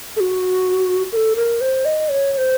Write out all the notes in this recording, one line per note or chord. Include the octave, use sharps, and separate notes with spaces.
A4
F#4
A#4
A4
A#4
C5
D#5
C#5
C#5
C5